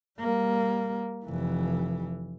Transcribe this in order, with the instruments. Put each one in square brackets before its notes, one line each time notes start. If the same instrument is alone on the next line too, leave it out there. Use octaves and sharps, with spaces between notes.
[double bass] G3 A#3
F1 E3